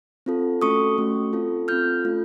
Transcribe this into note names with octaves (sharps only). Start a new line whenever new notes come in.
C4 F4 A4
A3 C#4 F#4 A4 C#6 D#6
A3 C#4 F#4 A4
C4 F4 A4
C4 F4 A4 F6 G6
A3 C#4 F4 A4